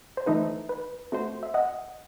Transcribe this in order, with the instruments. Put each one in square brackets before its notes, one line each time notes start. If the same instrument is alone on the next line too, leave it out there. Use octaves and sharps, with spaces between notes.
[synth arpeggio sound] C5
[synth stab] E3 A3 D#4 [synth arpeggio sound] B4
[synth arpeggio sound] B4
[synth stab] A3 C4 F#4 C5
[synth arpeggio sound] E5
D#5 F#5